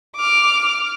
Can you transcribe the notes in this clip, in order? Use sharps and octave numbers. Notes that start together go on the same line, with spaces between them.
D6 F6